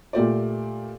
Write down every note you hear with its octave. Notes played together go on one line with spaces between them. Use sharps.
A#2 A3 G4 D5